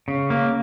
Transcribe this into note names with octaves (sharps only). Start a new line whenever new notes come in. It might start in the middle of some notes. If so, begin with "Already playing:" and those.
C#3
A#3